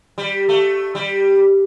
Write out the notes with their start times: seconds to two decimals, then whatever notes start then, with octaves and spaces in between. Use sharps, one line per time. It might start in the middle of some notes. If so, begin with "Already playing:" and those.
0.18 G3
0.49 A3
0.95 G3